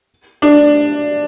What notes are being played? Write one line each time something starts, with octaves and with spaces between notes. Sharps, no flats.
D4